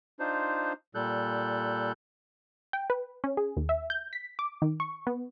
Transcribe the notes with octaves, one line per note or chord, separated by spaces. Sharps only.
D4 D#4 F4 C5
A#2 G3 A4 F#6 G6
G5
B4
C#4
G#4
D#2
E5
G6
B6
D6
D#3
C#6
B3